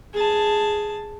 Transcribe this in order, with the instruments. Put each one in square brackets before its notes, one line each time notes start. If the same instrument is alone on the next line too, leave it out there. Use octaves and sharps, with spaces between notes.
[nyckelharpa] G#4 A5